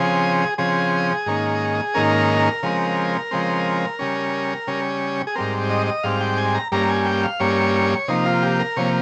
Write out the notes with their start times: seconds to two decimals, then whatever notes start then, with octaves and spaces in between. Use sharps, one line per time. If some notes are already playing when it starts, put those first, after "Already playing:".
Already playing: C#3 F3 C4 G#4
0.58 C#3 F3 C4 G#4
1.26 G#2 D#3 A#3 C#4
1.94 G#2 D#3 A#3 C#4 A#4
2.63 C#3 F3 G#3 C4
3.31 C#3 F3 G#3 C4
3.99 C#3 G3 C#4
4.67 C#3 G3 C#4
5.27 G#4
5.35 G#2 G3 C4 A#4
5.70 D#5
5.87 D#5
6.03 G#2 G3 C4 F5
6.21 G5
6.38 G#5
6.55 A#5
6.72 G2 G3 A#3 C#4 A#5
6.89 G#5
7.06 G5
7.23 F5
7.40 G2 G3 A#3 C#4 C#5
8.08 C3 F3 A#3 D#4
8.26 F4
8.43 G4
8.60 A#4
8.77 C3 F3 A#3 C#5